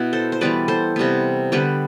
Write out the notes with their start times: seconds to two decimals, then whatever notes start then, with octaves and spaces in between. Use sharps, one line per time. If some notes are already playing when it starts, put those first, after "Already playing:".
Already playing: B2 B3 E4
0.13 A4 C5
0.32 C5
0.41 E3 G3 B3 B4 D5
0.68 A4 C5
0.96 C3 G3 B3
1.52 D3 G3 B3 G4 B4